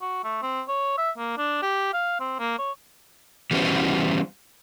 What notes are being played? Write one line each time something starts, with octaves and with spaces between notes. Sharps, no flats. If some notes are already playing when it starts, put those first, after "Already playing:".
F#4
A3
C4
C#5
E5
A#3
D4
G4
F5
C4
A#3
C#5
E3 G3 B3 C#4 F#4 C5